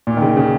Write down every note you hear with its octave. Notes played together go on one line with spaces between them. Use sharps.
A#2
D#3
C#3
C#3